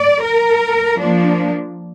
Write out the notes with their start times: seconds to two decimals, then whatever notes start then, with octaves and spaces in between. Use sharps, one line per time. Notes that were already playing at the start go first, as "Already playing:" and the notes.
Already playing: D5
0.23 A#4
0.97 F3 A#3 D4